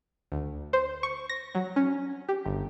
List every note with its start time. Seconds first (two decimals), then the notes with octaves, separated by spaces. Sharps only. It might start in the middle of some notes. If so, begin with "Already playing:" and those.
0.32 D2
0.73 C5
1.03 C#6
1.29 A#6
1.55 F#3
1.76 C#4
2.28 G4
2.46 G1